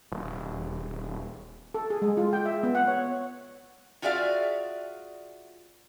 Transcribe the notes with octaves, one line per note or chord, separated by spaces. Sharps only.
D#1
A4
G#4
G#3
F4
G5
E5
B3
F#5
C#5
F4 F#4 G#4 D5 E5 F5